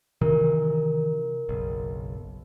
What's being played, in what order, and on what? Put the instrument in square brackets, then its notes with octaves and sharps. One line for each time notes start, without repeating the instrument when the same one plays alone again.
[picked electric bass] C3 D#3 E3 [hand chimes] A#4
[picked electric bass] F#1 B1